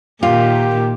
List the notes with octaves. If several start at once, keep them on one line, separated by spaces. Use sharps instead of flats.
A#2 D#3 F4 G4